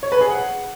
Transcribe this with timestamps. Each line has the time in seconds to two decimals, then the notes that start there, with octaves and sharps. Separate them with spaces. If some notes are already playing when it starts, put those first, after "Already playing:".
0.03 C#5
0.12 B4
0.21 G#4
0.30 F#5